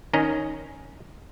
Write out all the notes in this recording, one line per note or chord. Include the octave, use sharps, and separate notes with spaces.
D#3 C#4 D#5 A#5